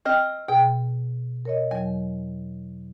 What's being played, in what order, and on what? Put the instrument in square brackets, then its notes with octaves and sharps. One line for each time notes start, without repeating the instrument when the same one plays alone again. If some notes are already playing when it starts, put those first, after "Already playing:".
[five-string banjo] C4 D#5 [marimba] F6
[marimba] B2 G#4 [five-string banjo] G5
[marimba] A#4 C#5 D#5
[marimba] E2 F#3 [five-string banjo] G#5